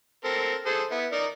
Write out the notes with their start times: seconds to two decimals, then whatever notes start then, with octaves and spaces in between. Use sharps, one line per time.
0.24 C4 A4 A#4
0.66 G#4 A4 C5
0.91 B3 E4
1.12 D#4 A#4 D5